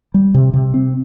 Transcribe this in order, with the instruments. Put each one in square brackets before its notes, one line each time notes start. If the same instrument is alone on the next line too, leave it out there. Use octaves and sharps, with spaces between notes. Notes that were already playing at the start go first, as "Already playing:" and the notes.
[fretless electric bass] G3
C3
C3
C4